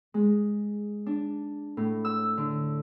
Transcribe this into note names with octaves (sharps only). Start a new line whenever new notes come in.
G#3
D4
A2
E6
D3